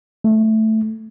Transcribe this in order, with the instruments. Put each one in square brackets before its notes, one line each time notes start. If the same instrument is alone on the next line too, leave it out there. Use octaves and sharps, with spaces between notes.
[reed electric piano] A3